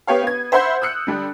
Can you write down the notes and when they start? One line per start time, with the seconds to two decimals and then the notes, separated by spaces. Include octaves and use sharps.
0.07 B3 G4 C#5 F5
0.23 B3 G#6
0.52 C5 E5 F#5 B5 C6 G6
0.82 D#6 E6 F#6 C#7
1.07 D3 G3 D4